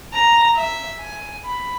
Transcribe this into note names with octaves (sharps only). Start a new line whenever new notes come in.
A#5
E5
G#5
B5